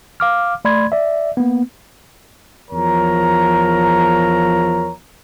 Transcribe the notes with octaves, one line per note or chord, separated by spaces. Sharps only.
F5 D6 F6
A3 D5 B5 C6 G#6
D5 E5
A#3 B3
E2 F3 A#4 C#5 A#5